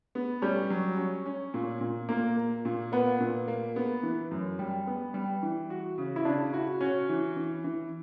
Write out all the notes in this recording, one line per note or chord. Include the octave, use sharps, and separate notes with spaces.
B3
G3 C#4
F#3
C#4
C#4
A#2
A#2
A#2 A#3
A#3
A#2
A#3 B3
A#2
A#3
B3
E3
F#2
G3
B3
G3
E3
F#4
C#3
E4
C#3 D4
E4 F#4
C#4 F#4
E3
E3
E3